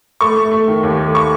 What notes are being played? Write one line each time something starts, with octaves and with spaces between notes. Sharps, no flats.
A3 C#6
A3
A3
D#3
D#2
A3
C#6